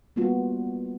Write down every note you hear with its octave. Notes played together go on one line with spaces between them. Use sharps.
G3 A#3 B3 F4 F#4